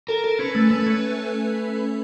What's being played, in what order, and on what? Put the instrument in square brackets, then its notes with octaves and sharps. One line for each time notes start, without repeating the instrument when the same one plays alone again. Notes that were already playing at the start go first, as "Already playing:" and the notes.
[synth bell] A4 [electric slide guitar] A#4
[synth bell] A4
[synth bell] C#4 [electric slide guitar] B4
[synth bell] A3
[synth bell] A3 [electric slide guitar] B4
[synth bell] C#4